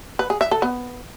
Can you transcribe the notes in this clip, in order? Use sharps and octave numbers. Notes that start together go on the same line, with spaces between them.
B4
G#4
E5
A4
B3